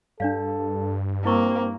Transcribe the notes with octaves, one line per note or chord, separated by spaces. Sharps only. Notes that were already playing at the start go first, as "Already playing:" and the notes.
G2 D4 A4 D5 F5
A#3 C4 E4 C#6 E6